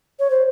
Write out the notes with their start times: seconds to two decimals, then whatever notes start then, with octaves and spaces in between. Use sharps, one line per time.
0.19 C#5
0.30 C5